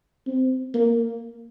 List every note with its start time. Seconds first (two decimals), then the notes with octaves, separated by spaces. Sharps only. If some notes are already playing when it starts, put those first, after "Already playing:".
0.27 C4
0.74 A#3